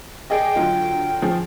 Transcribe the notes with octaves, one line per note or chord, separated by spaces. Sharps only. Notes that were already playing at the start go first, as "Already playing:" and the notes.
G#4 D5 D#5 G5
D3 F#3 F4
F3 C#4 G#4